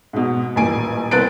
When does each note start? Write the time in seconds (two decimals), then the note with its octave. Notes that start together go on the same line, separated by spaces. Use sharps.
0.13 G#2 B2
0.56 D#1 A1 G#5 D7
1.11 C2 B3 C4 F#6 A6 D7